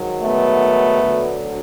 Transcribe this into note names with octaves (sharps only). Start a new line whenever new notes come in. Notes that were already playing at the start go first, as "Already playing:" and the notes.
Already playing: G#2 D#3 F#3
A3 B3
D2 D3 F#3